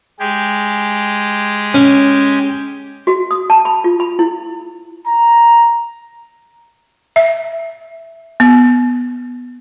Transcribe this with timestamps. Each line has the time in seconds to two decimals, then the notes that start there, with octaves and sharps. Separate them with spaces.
0.19 G#3 G4 G#4
1.74 C#4
3.07 F#4
3.31 D#6
3.50 A5
3.65 B5
3.84 F4
4.00 B5
4.19 E4
5.06 A#5
7.16 E5
8.40 B3